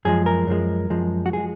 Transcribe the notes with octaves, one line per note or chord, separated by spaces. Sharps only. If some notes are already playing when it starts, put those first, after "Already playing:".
F#2 F3 G#3 G#4
A#4
F#2 F3 G#3
F#2 F3 G#3
F#4
F3 G#3 G#4